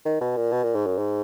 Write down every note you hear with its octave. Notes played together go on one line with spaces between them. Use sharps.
D#3
B2
A#2
B2
A#2
G#2
F#2
G#2